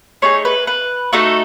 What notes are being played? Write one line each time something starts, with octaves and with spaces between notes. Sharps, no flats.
A3 D#4 G#4 C#5
B4
B4
A3 D#4 F#4 A4